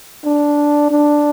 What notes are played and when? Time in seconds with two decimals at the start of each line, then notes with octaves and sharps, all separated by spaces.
0.25 D4
0.91 D4